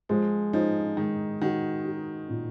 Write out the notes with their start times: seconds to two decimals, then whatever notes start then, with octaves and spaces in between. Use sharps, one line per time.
0.09 F3 G#3
0.53 F3 D#4
0.97 D#3 G#3
1.42 D#3 F#4
1.85 F#4
2.29 A#2